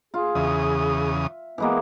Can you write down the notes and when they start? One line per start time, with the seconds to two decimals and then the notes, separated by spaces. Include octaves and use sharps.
0.14 F4 G#4
0.35 E2 C#3 E5 D#6
1.58 E3 G#3 A#3 B3